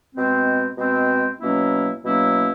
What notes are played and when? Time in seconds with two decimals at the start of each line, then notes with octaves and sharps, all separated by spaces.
0.15 B2 G#3 C4
0.77 B2 G#3 C4
1.41 B2 F#3 A#3 C#4 E4
2.03 B2 F#3 A#3 C#4 E4